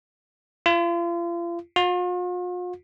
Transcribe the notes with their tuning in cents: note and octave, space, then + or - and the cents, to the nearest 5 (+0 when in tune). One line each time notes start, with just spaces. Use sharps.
F4 -35
F4 +45